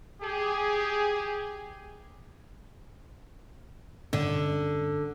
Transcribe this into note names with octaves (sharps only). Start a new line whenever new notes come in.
G4 G#4
G2 D3 C#4